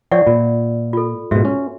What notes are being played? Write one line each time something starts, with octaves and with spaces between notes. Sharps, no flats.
F3 C#5 D5 E5 F#5 G5
A#2 F4
F4 A4
G#2 B2 F#4 E5
C#4